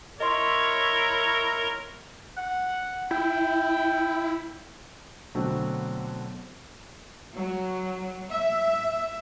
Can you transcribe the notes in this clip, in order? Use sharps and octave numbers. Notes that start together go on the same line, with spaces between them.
E4 A#4 C#5 D#5 C6
F#5
E4 G5
B2 D3 F#3 A3 C4
F#3
E5